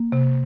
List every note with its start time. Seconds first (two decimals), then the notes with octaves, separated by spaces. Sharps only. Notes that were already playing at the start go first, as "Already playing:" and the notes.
Already playing: A#3
0.12 C3